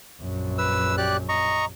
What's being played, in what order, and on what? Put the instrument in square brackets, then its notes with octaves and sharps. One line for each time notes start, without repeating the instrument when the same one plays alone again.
[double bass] A#1 F#2
[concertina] B4 E6
G4 D5 F#6
D#5 A#5 C#6